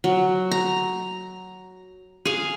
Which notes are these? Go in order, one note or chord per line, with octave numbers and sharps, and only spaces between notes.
F#3
A#5
G#4 F5